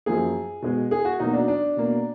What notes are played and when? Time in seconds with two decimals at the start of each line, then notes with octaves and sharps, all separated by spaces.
0.06 F#2 F3 A#3 G#4
0.62 B2 G#3
0.91 G#4
1.05 F#4
1.20 B2 F#3 A#3 D#4
1.33 D4
1.48 D4
1.77 B2 A#3